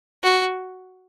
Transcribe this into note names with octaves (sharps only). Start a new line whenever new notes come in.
F#4